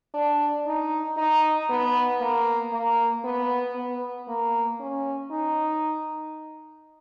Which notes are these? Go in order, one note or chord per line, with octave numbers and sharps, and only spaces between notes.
D4
D#4
D#4
B3
A#3
A#3
B3
B3
A#3
C#4
D#4